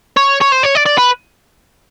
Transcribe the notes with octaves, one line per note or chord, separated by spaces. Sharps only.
C#5
C#5
C5
C#5
D5
D5
B4